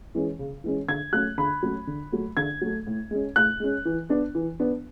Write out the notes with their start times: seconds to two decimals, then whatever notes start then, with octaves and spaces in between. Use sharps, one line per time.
0.15 E3 G#3 C#4
0.39 C#3
0.64 E3 G#3 C#4
0.88 D3 G#6
1.12 F#3 A3 C#4 F#6
1.38 D3 B5
1.63 F#3 A3 C#4
1.87 D3
2.12 F#3 A3
2.37 D3 G#6
2.61 F#3 A3
2.87 A2
3.11 G#3 C#4
3.36 A2 F#6
3.60 G#3 C#4
3.85 E3
4.10 B3 D4
4.35 E3
4.60 B3 D4